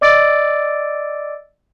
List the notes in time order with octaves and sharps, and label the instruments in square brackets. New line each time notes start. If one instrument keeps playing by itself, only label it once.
[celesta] D5 D#5 D6 E6 A6 D7